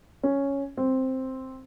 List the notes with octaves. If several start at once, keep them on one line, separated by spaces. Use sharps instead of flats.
C#4
C4